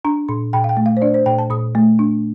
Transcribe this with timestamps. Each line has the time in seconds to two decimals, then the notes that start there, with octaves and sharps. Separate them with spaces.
0.05 D4 A#5
0.29 A#2 C6
0.53 A#2 G5
0.64 F5
0.69 G5
0.77 A3
0.86 F5
0.97 C5
1.02 D4 D5
1.14 C5
1.26 A#2 G5
1.38 A5
1.50 A#2 D#6
1.75 A3
1.99 D4